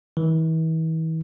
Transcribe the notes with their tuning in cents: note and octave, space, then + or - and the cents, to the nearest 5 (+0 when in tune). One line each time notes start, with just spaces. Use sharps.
E3 -40